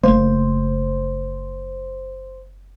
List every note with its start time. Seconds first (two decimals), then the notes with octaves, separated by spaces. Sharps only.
0.03 F#1 A3 A#3 C5